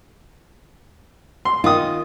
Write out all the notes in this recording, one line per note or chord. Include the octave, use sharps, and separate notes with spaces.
C6
D#3 F4 D#6